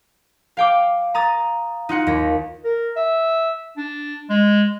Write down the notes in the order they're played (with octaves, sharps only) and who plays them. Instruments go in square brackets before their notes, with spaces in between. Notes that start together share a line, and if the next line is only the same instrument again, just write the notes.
[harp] F5 G5 D6
A#5 D#6 A6
D#4 F4 F#5
D#2 A#6
[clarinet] A#4
E5
D4
G#3